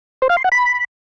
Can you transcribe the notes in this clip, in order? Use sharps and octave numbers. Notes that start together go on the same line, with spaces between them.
C5
F5
C6
F#5
B5